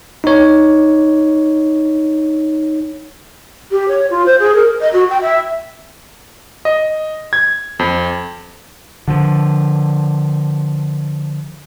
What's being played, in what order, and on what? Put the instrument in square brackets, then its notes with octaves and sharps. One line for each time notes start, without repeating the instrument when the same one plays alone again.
[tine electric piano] D#4 C#5
[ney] G4
C#5
F4
C5
G#4
A#4
D#5
F#4
G5
E5
[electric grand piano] D#5
G#6
F2
[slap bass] D3 F3